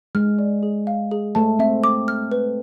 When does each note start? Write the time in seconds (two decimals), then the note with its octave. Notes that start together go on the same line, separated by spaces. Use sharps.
0.15 G#3 F6
0.39 D5
0.63 G#4
0.87 F5
1.11 G#4
1.35 A3 A5
1.59 C4 E5
1.84 D6
2.08 F6
2.32 B4